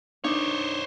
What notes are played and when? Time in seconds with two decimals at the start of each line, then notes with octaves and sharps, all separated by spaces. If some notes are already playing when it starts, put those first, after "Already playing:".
0.24 D4 D#4 C5 C#5